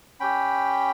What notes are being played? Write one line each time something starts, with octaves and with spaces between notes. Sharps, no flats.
C#4 G4 G5 B5